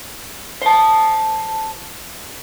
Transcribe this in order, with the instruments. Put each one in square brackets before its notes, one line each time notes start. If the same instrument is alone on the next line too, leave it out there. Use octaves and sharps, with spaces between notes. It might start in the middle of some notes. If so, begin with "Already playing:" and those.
[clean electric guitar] C5 A5